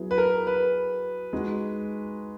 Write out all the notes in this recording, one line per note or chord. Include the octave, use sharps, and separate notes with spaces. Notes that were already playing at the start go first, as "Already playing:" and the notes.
Already playing: F#3 B3 E4 G#4
B4
A#4
B4
G#3 D#4 F#4